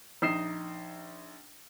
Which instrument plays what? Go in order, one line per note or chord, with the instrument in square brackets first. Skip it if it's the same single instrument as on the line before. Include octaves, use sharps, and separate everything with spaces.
[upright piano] A#1 D#4 D#6 C7 E7